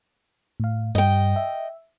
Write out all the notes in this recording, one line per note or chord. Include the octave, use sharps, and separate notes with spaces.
A2 F5
G2 G3 D#5 G5
E5